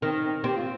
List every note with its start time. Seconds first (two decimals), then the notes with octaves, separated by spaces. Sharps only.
0.02 D#3 C4
0.23 C4
0.44 C4 G4
0.55 F4